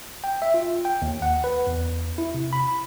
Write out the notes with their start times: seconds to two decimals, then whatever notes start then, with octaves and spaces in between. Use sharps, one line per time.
0.24 G5
0.42 E5
0.54 F4
0.85 G5
1.02 D#2
1.22 F#5
1.44 B4
1.67 E2
2.18 E4
2.34 C3
2.53 B5